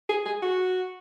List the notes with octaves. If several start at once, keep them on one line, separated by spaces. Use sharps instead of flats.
G#4
G#4
F#4